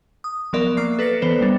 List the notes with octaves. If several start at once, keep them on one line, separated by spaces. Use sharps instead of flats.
D#6
F3 F#3 B3 A#4 D5 E5
A#3 D6 F#6 C7
A4 B4 D5 A#6 C7 C#7
E3 B3 B4 C5 E7
G3 B3 D4